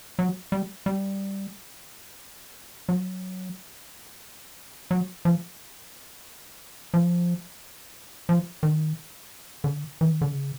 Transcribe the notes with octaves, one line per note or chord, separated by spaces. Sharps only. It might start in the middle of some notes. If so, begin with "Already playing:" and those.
F#3
G3
G3
F#3
F#3
F3
F3
F3
D#3
D3
E3
D#3
D3
C#3